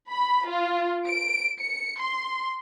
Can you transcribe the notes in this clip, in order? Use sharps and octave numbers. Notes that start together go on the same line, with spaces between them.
B5
F4
D7
C#7
C6